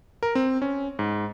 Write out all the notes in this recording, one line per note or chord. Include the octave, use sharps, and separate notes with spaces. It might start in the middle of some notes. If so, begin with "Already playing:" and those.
A#4
C4
C#4
G#2